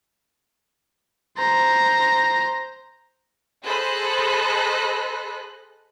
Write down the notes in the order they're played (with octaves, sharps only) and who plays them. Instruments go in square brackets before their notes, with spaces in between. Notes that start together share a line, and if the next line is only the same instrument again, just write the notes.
[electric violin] C5 A#5
[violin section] G#4 A4 C5 D#5 B5 F#6